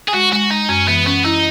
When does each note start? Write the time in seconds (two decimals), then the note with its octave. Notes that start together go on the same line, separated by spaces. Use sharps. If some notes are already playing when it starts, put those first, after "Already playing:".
0.08 G#4
0.14 G#3 F#4
0.32 G#3 F#4
0.51 G#3 D#4
0.69 F#2 C#4
0.88 E3 B3
1.06 B3 C#4
1.25 D#4 E4